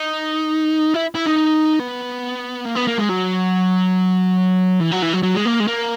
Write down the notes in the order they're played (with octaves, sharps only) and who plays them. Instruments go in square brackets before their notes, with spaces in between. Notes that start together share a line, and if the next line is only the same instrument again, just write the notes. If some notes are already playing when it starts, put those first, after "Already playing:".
Already playing: [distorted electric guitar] D#4
E4
E4
D#4
B3
A#3
B3
A#3
G#3
F#3
E3
F#3
E3
F#3
F#3
G#3
A#3
G#3
A#3